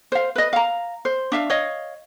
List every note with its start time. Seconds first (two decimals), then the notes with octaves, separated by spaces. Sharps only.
0.12 C5 F5
0.36 B4 D#5
0.53 F5 A#5
1.05 C5
1.32 D4 E5 F5
1.50 C#5 D#5 F5